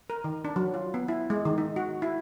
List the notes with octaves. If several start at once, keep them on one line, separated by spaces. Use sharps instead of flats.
A#4
D#3
D4
F#3
F4
B3
E4
G#3
D#3
D#4
F#4
E4